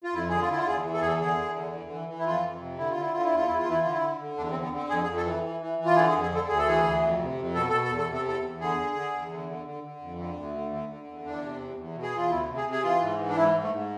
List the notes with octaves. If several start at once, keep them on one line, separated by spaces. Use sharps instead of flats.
F4
F2 E4
D3 G#4
F4
D3 E4
F4
E2 G#4
E3
A4
E2 G#4
A4
D3 G#4
E2
D3
E3
E3
E3
E4
F2 F4
F2
C3
D3 E4
F4
D3 E4
D3 F4
E4
E2 F4
E2 E4
F4
E3 E4
D3 F4
E4
D3
D3
E2 D4
C4
D3
B3
D3 C4
F2 G#4
G#4
F2
A4
E3
E3
E3
E3
F4
D3 G#4
G#4
F2
G#4
D3 A4
D2 G#4
A4
E3 G#4
D2
F2
C3
F2
B2 A4
A4
B2
A4
E2
A4
C3
A4
E2 A4
E2
D3 G#4
D3
D3
E2
D3
D3
D3
D3
F2
D3
D2
D3
D3
D3
E2
E2 D4
C3
E2
E2
B2
G#4
E2 F4
D2 E4
C3
G#4
C3
G#4
E3 F4
G#2
E3
D4
G#2 E4
G#2
A3
G#2